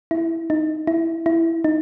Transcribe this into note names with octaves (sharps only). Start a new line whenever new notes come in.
E4
D#4
E4
E4
D#4